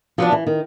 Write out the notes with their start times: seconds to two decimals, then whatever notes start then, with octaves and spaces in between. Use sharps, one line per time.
0.18 F3 F#3 B3 D4
0.32 E3
0.47 D#3